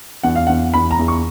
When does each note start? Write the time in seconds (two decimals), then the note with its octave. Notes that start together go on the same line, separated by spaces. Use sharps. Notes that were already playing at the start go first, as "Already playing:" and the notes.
0.23 E2 F#5
0.36 F5
0.47 E2 F#5
0.74 E2 B5
0.91 A#5
0.99 E2
1.08 C#6